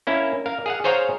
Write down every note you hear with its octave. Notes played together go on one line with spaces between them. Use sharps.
A#3 C#4 E4
A#4 F5
G#4 F5 F#5
G#4 C5 C#5 F5 A#5